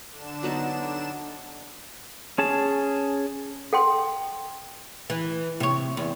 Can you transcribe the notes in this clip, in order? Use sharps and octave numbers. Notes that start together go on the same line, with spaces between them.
D3 D4 E7
F#3 B3 D#4
C#4 G#4 A5
A4 G5 C6
E3
C3 C#5
E2